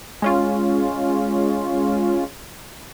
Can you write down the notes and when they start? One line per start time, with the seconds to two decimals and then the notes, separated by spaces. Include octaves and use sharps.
0.22 G#3 C#4 F4